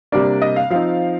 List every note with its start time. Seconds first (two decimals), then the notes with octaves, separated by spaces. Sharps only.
0.12 C3 G3 A#3 D4 D5
0.42 D#5
0.56 F5
0.70 F3 C4 D#4 F5